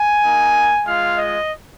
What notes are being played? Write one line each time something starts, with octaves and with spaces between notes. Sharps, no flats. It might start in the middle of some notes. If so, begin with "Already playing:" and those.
Already playing: G#5
A#3 D#4
G#3 F4 F5
D#5